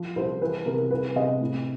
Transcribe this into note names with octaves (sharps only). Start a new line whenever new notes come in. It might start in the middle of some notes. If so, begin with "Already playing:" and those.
Already playing: F3
C2 C5
E3 B4
C3 A#4
C2 B4
C3 D#5
A2